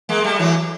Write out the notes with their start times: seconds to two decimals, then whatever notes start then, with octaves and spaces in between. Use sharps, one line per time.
0.09 G#3 A#3
0.24 G3 A3
0.39 E3 F#3